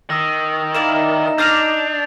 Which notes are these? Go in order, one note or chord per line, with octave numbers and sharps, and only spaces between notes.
D#3 D#6 E6 A#6
A#3 D#4 E4 D5 E7
D4 D#5 D6 F6 G6 C7 F7